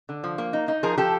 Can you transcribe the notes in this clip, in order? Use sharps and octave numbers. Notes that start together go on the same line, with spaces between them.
D3
F3
A#3
D#4
D#4
F3 G#4 A#4
F3 G4 A4